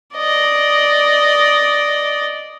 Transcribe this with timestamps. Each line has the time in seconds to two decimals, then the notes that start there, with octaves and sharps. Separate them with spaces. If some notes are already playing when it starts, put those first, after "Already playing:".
0.16 D5 D#5